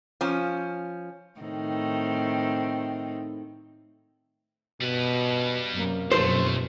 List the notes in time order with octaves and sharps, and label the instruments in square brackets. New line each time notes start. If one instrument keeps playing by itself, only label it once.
[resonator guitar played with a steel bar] F3 C#4
[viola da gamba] A2 D#3 C4
[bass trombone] B2 [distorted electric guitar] G3 B4
[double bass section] F#2 C3 A#3
[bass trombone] F1 [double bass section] F#2 B2 [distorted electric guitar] D3 A3 [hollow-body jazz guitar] C5